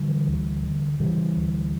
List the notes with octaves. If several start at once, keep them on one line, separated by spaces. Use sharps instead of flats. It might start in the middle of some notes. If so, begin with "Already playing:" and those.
Already playing: D3 E3 G3
D2
D3
C#3 E3 G3
D2